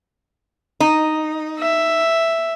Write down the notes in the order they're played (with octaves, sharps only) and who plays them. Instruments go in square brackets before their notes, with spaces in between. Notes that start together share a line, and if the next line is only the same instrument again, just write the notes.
[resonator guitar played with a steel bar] D#4
[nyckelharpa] E5